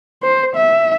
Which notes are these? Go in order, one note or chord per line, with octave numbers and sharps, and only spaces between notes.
C5
E5